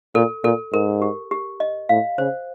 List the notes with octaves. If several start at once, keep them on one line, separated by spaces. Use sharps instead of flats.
A#2 A4
A#2 A4
G#2 A#4
G4
G4
D#5
A2 F5
C#3 C5